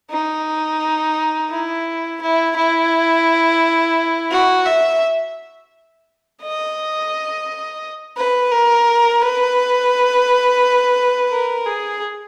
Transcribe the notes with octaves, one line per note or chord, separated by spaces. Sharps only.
D#4
E4
E4
E4
F#4
E5
D#5
B4
A#4
B4
A#4
G#4